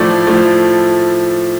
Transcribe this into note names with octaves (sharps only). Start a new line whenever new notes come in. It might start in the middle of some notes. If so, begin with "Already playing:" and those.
Already playing: A2 F3 A3 D5
A2 F3 A3